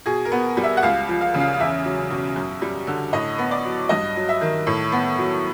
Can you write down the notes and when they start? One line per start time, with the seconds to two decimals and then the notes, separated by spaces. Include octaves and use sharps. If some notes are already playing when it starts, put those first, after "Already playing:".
0.06 B2 G#4
0.25 A#4
0.32 B3
0.57 G3
0.64 E5
0.77 F#5
0.83 C#2 F5
1.08 F3
1.21 F5
1.34 C#3
1.40 F5
1.54 F5
1.60 E2 E5
1.85 F#3
2.10 B2
2.36 F#2
2.62 G3
2.87 D3
3.13 A2 D#5
3.38 B3
3.51 D5
3.65 F#3
3.89 G2 D#5
4.16 F#3
4.29 E5
4.41 D#3
4.67 A2
4.92 B3
5.18 F#3